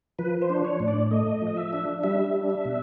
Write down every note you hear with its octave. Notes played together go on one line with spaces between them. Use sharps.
F3 B4
C5
D4
C#5
A2
D5
A3 D#5
F3
D#5
E5
D4
G3 E5
D4
E5
B2